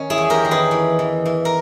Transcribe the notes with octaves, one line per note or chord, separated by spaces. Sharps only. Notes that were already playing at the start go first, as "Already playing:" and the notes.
Already playing: D#3 C#4
E4 G#4
E2
G4 A#4
D#3
G#4 B4
E3
E3
E3
A#4